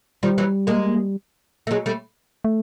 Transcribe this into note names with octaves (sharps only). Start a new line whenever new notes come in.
D#3 F3 G3
E3 F#3
G#3 A#3
A3
F#3 G#3
G3 A3
A3